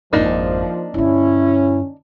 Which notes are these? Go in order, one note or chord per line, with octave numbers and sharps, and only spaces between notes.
G#1 F2 F3 A#3 D4 D#4
G2 D3 C#4 E4